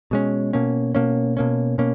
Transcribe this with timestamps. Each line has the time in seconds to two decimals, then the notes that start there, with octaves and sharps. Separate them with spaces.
0.11 B2 G#3 C#4
0.53 B2 A#3 C#4
0.95 B2 A#3 C#4
1.37 B2 A#3 C#4
1.78 B2 A#3 C#4